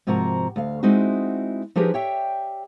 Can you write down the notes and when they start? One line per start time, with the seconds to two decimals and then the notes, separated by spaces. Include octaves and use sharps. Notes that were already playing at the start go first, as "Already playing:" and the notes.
0.07 G#2 C3 F3 F#4 A#4 A#5
0.56 D2 F5
0.83 G#3 C4 D#4 E4 F#4
1.76 F3 D#4 G4 G#4 A#4 B4
1.94 G4 C#5 D5 E5 G5